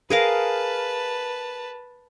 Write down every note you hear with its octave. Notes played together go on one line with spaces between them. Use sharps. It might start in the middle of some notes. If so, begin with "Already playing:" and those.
G#4 A#4 B4 F5 A5